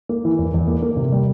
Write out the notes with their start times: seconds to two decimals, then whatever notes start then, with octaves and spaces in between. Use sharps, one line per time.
0.09 A#3
0.25 E3
0.38 E2
0.54 E2
0.68 A#3
0.82 A#3
0.97 C3
1.12 G3